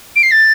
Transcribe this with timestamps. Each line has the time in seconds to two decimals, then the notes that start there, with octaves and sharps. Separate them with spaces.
0.16 D7
0.23 C7
0.31 A6